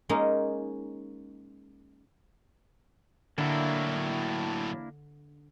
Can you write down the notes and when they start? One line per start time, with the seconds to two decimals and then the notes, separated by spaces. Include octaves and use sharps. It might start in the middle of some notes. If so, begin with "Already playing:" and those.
0.09 G#3 A#3 C#4 D#4
3.38 A2 D3 F#3 A#3 D4 E4